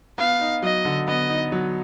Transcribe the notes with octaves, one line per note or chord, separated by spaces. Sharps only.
B3 F5
D#4
F#3 D#5
D3
B3 D#5
D#4
F#3